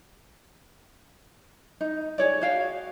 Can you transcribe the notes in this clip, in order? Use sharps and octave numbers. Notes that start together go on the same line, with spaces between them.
D#4
G#4 C#5 D5
F#4 F5 G5